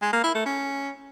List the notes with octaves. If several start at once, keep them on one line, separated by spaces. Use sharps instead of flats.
G#3
A#3
E4
A3
C#4